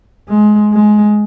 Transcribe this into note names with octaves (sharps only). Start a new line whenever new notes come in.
G#3
G#3